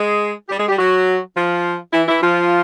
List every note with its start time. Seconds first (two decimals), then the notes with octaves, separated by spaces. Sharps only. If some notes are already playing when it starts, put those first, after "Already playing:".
Already playing: G#3 G#4
0.49 G3 G4
0.58 G#3 G#4
0.68 G3 G4
0.78 F#3 F#4
1.35 F3 F4
1.93 E3 E4
2.08 E3 E4
2.22 F3 F4